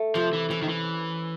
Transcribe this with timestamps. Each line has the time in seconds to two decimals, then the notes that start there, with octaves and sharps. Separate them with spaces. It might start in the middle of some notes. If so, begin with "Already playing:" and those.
Already playing: A3
0.15 C3 F3
0.33 E3
0.50 E3 C#4
0.62 D#3
0.68 E3